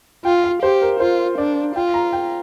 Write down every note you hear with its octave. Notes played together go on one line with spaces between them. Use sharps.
F4 G5
F5
G4 C5
A#4
F4 C5
D4 D5
F4 G5
A#5
G5